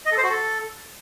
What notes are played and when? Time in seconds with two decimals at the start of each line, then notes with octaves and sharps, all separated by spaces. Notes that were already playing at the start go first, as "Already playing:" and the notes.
0.06 D#5
0.12 A4
0.17 C5
0.23 F#4
0.29 A4